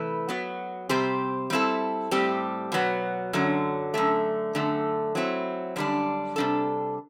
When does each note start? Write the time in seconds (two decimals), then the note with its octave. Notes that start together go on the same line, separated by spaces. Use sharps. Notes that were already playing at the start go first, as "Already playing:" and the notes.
Already playing: C3 E3 A3 E4 B4
0.29 F#3 B3 F#4
0.89 C3 G3 C4 G4 C5
1.50 G3 C4 E4 A4
2.11 A2 G3 C4 G4
2.72 B2 F#3 B3
3.33 F#2 D3 F#3
3.94 F#2 D3 A3
4.55 F#2 D3 A3
5.15 F#3 C4 E4
5.76 F#2 D3 G3 D4
6.36 C3 G3 D4 A4